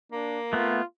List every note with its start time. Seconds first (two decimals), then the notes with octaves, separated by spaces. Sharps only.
0.12 A#3 D4
0.53 A3 B3 F4